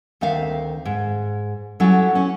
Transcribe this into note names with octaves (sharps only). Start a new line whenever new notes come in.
D2 D#3 C4 E5 F5
G#2
F#3 G3 C#4 E4 A4
C#4